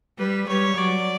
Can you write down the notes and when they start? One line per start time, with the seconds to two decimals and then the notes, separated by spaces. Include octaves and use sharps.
0.18 G3 B4
0.48 G3 C#5
0.77 F#3 D5